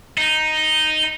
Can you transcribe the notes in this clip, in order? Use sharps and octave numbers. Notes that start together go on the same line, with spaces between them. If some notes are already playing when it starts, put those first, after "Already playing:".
D#4